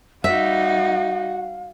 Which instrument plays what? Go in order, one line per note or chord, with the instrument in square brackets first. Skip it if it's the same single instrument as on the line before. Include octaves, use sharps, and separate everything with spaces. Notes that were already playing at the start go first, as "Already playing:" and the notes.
[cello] G3 D#4 [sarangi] F#4 [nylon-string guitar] E5 [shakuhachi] F5